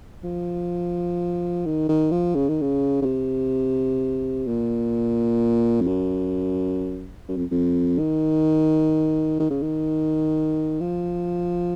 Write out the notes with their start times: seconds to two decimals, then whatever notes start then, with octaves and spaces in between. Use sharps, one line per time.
0.24 F3
1.66 D#3
1.89 D#3
2.11 F3
2.35 C#3
2.49 D#3
2.62 C#3
3.02 C#3
3.05 C3
4.47 A#2
5.81 F2
5.87 F#2
7.29 F#2
7.37 F2
7.51 F2
7.99 D#3
9.40 D#3
9.50 C#3
9.62 D#3
10.81 F3